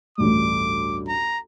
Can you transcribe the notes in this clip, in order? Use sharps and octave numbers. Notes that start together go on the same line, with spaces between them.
A1 D2 G2 D6
A#5